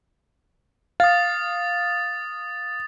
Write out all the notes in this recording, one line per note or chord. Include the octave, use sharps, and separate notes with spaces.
F5 D#6 A6